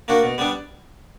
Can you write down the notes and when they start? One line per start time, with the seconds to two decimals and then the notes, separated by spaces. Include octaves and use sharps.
0.08 A#3 D4 F#4
0.23 B2
0.38 G3 B3 D4